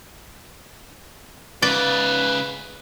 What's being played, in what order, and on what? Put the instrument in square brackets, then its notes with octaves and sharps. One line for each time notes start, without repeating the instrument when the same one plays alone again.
[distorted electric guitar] G#2 C#3 [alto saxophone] B4 [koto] D5